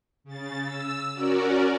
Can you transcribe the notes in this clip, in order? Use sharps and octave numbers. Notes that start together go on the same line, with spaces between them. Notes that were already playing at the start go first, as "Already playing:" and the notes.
C#3 A6
E6
C#4 F#4 A#4 D5